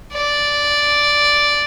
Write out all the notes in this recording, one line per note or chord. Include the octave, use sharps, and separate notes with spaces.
D5